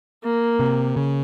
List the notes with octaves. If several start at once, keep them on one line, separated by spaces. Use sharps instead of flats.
A#3
C3
C#3